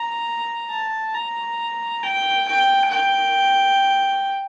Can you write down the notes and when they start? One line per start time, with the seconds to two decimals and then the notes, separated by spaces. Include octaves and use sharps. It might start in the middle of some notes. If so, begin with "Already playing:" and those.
Already playing: A#5
0.70 A5
1.14 A#5
2.03 G5
2.47 G5
2.91 G5